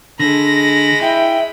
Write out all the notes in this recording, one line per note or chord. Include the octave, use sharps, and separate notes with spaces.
D3 G#3 B5 A#6
E4 E5 G5